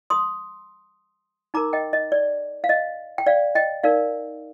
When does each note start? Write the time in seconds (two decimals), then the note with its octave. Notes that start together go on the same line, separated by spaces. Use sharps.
0.10 C6 D#6
1.54 D#4 A#4 A#5 D6
1.73 D#5 G5
1.93 D#5
2.12 D5
2.64 F5
2.69 D#5
3.18 G5
3.27 D5 F5
3.55 D#5 G5
3.84 D#4 A#4 D5 F5